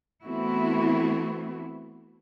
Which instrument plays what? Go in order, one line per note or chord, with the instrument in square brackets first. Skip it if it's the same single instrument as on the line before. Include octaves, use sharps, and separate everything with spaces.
[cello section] E3 A3 B3 C4 E4 F#4